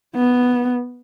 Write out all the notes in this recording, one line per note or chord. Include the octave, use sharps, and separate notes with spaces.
B3